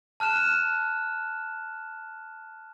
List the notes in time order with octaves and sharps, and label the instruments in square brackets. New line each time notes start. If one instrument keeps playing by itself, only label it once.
[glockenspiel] A5 F6 F#6 E7